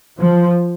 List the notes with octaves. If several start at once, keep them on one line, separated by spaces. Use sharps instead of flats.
F3